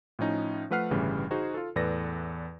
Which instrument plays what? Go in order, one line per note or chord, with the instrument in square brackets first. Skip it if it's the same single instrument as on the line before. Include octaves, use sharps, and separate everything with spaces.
[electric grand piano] A2 F3 C#4 D#4
F3 A3 B4 F#5 F6 C7
G1 A2 C#3 E3 G3
D#4 F#4 G#4 C5
F4 A4
E2 A2 A4 B4 D5 A#6